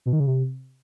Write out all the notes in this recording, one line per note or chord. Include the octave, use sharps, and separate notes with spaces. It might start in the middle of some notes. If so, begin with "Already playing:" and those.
B2
D#3
C#3
C3